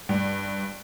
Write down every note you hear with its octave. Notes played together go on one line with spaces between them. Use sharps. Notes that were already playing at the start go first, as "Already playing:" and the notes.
G2